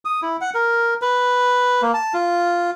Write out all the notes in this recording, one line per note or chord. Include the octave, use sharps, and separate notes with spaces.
D#6
E4
F#5
A#4
B4
A#3
A5
F4